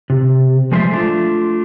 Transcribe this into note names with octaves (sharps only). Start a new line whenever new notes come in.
C3
F3 G#3 C5 D5 E5
A3 D4 F4